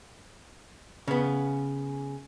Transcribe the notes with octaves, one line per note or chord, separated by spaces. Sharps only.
C#3 B3